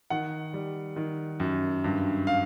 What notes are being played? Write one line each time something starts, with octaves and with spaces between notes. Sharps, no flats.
D#3 F#5
G3
D#3
F#2
G2
F5